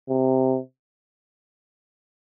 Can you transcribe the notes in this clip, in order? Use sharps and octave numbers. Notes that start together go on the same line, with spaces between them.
C3